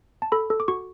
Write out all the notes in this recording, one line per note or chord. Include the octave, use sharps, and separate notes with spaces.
A5
A4 B5
A4
D6
F#4 C#6